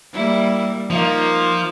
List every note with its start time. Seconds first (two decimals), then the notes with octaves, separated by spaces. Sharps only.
0.14 G3 A#3 E4
0.90 F3 A#3 D#4